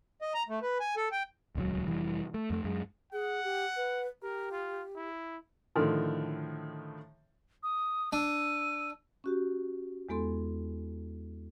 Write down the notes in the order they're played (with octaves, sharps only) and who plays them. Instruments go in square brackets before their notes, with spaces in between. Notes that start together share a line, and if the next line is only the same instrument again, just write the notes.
[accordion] D#5
A#5
A3
B4
G#5
A4
G5
[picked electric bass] D#1 C#2 C3 F#3
F1 E3 G3
A3
F2 A3
F#2 G#3
[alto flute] G#4 [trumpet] F#5
[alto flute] G4
B4
[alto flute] G4 [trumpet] A#4
[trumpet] F4
E4
[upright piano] A2 D3 D#3 F3
[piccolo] D#6
[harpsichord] D4 [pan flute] E6 [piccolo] D#7
[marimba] C#4 F#4 G4
E2 G#3 B3 A4 C6